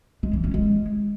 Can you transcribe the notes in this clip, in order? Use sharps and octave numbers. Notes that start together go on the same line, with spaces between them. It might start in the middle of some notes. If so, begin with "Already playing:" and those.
G#3
E3
C#4
G#3